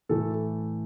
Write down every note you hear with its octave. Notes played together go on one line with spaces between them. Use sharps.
A2 E3 A3 A4